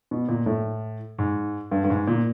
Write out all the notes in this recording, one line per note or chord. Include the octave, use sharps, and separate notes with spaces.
B2
A#2
A2
G#2
G2
G2
G#2
A#2